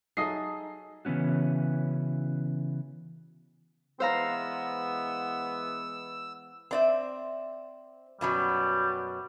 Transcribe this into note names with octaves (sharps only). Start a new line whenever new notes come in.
F#3 D#4 G#4 A4 D#5 E5 D#6 C7
C#3 E3 B3 C#4 F#4
E3 G#3 B3 C5 F5 A#5 E6
C4 D5 E5
F#2 B2 F#3 G3